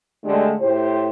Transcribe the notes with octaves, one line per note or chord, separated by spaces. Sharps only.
D3 G#3 A3 D4 G4
A2 G4 C5